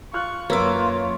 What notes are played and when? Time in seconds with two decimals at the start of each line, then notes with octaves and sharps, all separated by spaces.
0.13 F4 C#6 F6 F#6
0.50 F#2 A#3 F4 B4 C#5 E5 D6